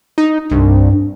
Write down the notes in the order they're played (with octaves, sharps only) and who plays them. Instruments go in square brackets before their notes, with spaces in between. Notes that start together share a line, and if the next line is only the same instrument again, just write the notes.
[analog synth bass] D#4
[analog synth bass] C2 [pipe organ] G2